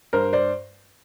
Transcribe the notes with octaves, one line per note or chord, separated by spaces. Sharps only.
G2 A#4 C5
C5 D5